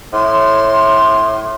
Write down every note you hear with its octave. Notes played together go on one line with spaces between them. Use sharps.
A2 C6